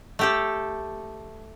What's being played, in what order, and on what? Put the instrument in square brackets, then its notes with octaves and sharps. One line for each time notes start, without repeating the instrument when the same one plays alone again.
[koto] A3 G4 A4